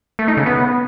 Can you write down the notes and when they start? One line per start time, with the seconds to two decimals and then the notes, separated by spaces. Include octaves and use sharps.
0.19 A3
0.28 D#4
0.37 C#3
0.46 B3